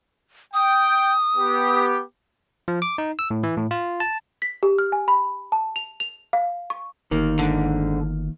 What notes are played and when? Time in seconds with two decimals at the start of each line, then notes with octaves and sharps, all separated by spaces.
0.54 G5 D#6
1.36 B3 G4
2.68 F3
2.82 D6
2.98 D#4
3.19 E6
3.31 A2
3.43 E3
3.57 A2
3.71 F4
4.00 A5
4.42 B6
4.63 G4
4.79 F6
4.92 G#5
5.08 B5
5.52 A5
5.76 F7
6.00 F7
6.33 F5
6.70 C#6
7.11 G1 D#3 A#3
7.39 G#2 D3